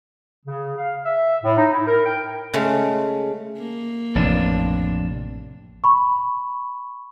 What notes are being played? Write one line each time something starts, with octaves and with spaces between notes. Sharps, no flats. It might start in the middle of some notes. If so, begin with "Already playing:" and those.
C#3
F5
E5
A2
D#4
E4
A#4
G5
C#3 G#3 A3 F5
A#3
A1 F2 C3 D4
B5 C#6